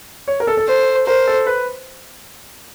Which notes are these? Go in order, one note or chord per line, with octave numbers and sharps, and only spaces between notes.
C#5
A#4
A4
A4
A4 C5
A#4 C5
A4
B4